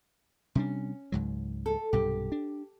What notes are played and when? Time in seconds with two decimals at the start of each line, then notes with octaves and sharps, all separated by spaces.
0.55 C3 G3 C#4 D4
1.12 C#2 G#2 F#3
1.66 A4
1.93 B1 G2 C3 G4
2.32 D4